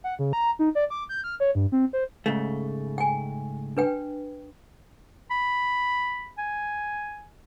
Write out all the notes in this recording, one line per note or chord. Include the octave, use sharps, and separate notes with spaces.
F#5
C#3
A#5
D#4
D5
D6
G6
F6
C#5
G2
C4
C5
G#2 C#3 A3
G5 G#5
D4 B4 G5
B5
G#5